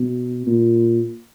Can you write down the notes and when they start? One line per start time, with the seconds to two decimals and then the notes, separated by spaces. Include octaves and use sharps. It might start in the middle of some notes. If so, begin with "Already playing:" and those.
Already playing: B2
0.47 A#2